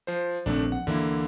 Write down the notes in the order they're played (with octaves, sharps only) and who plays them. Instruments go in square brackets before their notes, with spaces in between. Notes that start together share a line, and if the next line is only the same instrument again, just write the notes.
[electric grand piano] F3 C5
[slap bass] A#1 C4 [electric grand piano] D#2 A3 D4
[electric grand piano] F#5
[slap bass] D2 E3 [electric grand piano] D3 A#3 E4